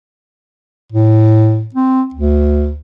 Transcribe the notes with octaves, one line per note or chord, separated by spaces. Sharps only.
A2
C4
D2